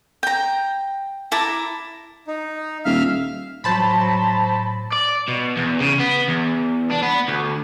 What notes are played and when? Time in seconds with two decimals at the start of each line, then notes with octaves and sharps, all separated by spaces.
0.23 G5 A#5
1.32 E4 A5 A#5 D6
2.27 D#4
2.85 D#1 E5 F5 F6
3.64 A2 F#3 C5 A5 B5
4.92 D5
5.28 B2
5.57 E2
5.80 C#3
5.99 B3
6.28 E2
6.91 D4
7.03 B3
7.28 D2